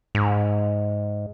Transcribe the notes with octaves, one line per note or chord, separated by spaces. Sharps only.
G#2